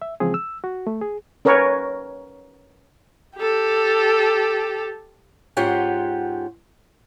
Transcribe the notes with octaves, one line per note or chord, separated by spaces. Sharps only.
E5
C#3 E3 F3 G#3 C4 G#4
E6
F#4
A3
G#4
C#4 A#4 B4 C#5
G4 A4
G#2 C#4 F4 G4 F#5